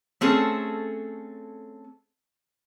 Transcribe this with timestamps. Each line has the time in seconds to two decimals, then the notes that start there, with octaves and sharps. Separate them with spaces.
0.21 A3 C4 C#4 G#4 A4